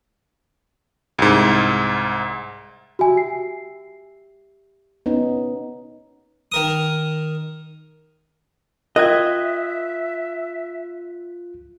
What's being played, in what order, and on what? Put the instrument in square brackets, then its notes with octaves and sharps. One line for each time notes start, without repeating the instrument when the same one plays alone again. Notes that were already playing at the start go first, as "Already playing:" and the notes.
[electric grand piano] C2 G#2
[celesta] F#4 G#5 [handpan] G4 E5
[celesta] C7
[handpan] B3 C#4 D#4
[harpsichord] D#3 A#4 D#6
[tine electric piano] F4 F#6 [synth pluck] A#4 G5 G#6 [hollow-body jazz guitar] D#5 [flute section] E5